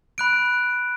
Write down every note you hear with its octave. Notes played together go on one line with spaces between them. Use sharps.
B5 F#6 D7